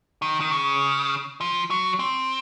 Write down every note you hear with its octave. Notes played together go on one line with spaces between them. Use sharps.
D#3
D#3
C#3
F3
F#3
C4